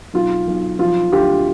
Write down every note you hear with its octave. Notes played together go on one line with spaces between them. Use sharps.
B1 F4
B1
F3 F4
D2 F4 G4